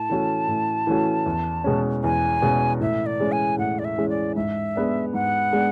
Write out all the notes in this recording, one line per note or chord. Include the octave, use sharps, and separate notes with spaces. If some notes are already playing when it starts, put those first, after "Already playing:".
Already playing: A2 A5
E3 A3 C#4 F#4
A2
E3 A3 C#4 F#4
E2
B2 G#3 C#4
E2 G#5
B2 G#3 C#4
A2 E5
D5
E3 G#3 C#4
G#5
A2 F#5
D5
E5
E3 G#3 C#4
D5
G#2 E5
G#3 B3 D4
G#2 F#5
G#3 B3 D4